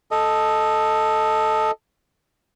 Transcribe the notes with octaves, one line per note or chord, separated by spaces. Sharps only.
A4 D#5